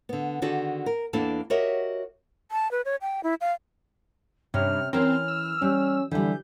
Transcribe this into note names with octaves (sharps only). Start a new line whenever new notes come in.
D3 B3
D3 D#3 D4 F#4 G#4 A4
A#4
E2 A#3 D4 E4 A4 A5
F#4 G4 A#4 C#5 D#5 E5
A5
B4
C#5
G5
E4
F5
G2 C3 C#4 F6
E3 C4 C#4 A#4 F6
E6
G3 C#4
D3 E3 G3 G6